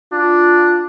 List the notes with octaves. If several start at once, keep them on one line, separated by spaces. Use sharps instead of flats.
D4 F4